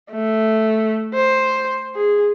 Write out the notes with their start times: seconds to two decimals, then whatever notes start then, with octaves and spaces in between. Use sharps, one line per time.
0.11 A3
1.14 C5
1.95 G#4